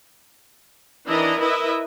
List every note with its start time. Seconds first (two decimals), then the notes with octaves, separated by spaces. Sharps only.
1.08 D#3 E3 D4 E4 D#5 A#5
1.40 E4 A#4 B4 D#5 E5